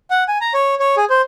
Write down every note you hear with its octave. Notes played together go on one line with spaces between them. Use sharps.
F#5
G#5
A#5
C#5
C#5
G#4
C5